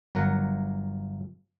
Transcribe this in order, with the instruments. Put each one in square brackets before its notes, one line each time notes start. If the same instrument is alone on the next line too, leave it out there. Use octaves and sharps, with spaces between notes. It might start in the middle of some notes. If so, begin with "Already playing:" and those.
[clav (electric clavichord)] G1 F#3 A#4 F#5